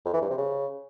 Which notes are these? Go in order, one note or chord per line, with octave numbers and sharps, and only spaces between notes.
F2
E3
G2
C3
C#3